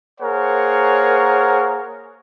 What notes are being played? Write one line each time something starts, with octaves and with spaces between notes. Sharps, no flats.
A#3 G#4 A#4 C5 C#5 F#5